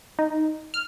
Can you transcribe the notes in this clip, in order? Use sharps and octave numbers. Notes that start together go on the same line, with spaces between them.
D#4
F6